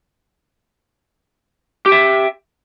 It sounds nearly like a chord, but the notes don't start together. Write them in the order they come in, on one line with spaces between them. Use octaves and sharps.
G4 G5 E5